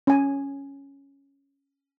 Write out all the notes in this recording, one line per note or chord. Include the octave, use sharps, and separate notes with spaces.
C#4 G#5